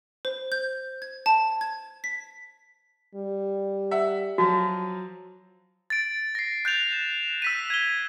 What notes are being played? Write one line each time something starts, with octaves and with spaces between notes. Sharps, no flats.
C5
G6
G#6
A5
G#6
B6
G3
E5 F#5
F3 F#3 F#4
A6 D7
A#6 C7
F#6 G6 A6 F7
E7
E6 B6 D#7
G#6 G7